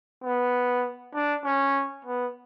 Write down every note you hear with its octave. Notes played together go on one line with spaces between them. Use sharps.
B3
D4
C#4
B3